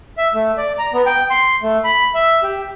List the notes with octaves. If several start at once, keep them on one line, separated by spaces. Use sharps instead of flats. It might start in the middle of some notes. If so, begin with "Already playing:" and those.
E5
A3
D5
A#5
B3
G5
C6
A3
B5
E5
G4